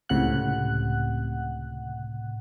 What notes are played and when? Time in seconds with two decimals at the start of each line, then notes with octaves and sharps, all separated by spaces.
0.09 C#2 A2 C3 F#5 F#6